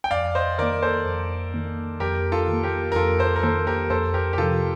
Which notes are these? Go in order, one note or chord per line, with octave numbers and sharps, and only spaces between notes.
G5
F2 D5 F5
C5 D#5
D#3 A#3 A#4 D5
A4 C5
F2
D#3 A#3
F2 G4 A#4
F4 A4
D#3 A#3
G4 A#4
A#4
F2 F4 A4
A4 C5
A#4
D#3 A#3 A4 C5
G4 A#4
F2 A4 C5
G4 A#4
G4
C3 F3 F4 A4